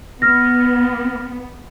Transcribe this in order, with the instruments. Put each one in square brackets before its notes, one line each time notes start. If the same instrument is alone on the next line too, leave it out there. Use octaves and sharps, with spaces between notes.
[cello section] B3 [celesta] F6 A#6